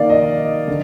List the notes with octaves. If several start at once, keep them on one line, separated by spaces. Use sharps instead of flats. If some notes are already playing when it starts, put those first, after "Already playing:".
Already playing: D#3 A#3 D5 F5
D#5
D3